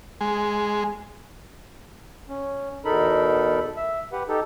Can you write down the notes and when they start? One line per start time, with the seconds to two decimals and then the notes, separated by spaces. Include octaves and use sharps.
0.21 G#3
2.29 C#4
2.85 E2 B2 D#4 A4 A#4 B5
3.77 E5
4.12 G4 B4 F#5
4.28 D#4 G4 A4